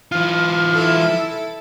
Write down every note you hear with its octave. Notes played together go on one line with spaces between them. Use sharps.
E3 F4 F6
E4 A4